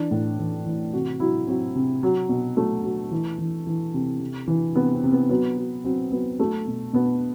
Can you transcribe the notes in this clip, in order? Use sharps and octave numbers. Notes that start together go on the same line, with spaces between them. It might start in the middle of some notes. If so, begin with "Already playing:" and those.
Already playing: E3 D4
A2
E3 E4
E3
C3 F#4
F#3 E4
F#3 C4
C3
F#3
B2
F#3 A3
F#3
E3
E3
E3
C3
C3
E3
C3 B3
C4
C3
B3
F#3 B3
F#3
F#3 C4
F#3 B3
F#3 A3
B2
B2 B3